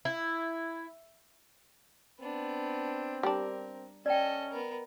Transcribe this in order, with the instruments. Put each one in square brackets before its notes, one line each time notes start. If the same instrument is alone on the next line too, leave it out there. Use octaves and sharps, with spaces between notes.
[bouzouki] E4
[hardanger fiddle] B3 D4 [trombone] C4
[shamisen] G3 D4 [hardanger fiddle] A#4
[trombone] C#4 [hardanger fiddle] A4 D#5 [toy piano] D5 G5
[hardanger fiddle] B3 A#4